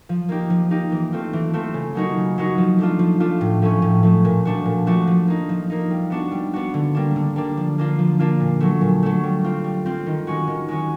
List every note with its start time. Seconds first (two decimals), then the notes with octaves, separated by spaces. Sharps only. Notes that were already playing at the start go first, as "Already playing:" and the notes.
0.09 F3
0.29 A#3 D#4 G4
0.50 F3
0.70 A#3 D#4 G4
0.92 E3
1.13 A3 C4 F4
1.33 E3
1.53 A3 C4 F4
1.74 C#3
1.95 F#3 A#3 D#4 F#4
2.17 C#3
2.38 F#3 A#3 D#4 F#4
2.58 F3
2.78 A3 D4 F4
2.99 F3
3.20 A3 D4 F4
3.41 A2
3.62 F3 A3 C#4
3.82 A2
4.03 F3 A3 C#4
4.25 A#2
4.45 F3 A3 D4 F#4
4.65 A#2
4.86 F3 A3 D4 F#4
5.07 F3
5.28 A#3 D#4
5.49 F3
5.70 A#3 D#4
5.91 G3
6.10 B3 D4 F#4
6.31 G3
6.53 B3 D4 F#4
6.74 D3
6.95 G3 A#3 D4
7.16 D3
7.36 G3 A#3 D4
7.57 F3
7.78 A#3 D4 F4
7.99 F3
8.19 A#3 D4 F4
8.40 A#2
8.60 F#3 A3
8.81 A#2
9.03 F#3 A3
9.23 G3
9.44 C4 F4
9.64 G3
9.86 C4 F4
10.06 D#3
10.27 G#3 C#4 F#4
10.48 D#3
10.68 G#3 C#4 F#4